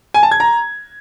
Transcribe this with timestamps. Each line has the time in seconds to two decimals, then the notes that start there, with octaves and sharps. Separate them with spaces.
0.14 G#5
0.23 A5
0.31 G#6
0.40 A#5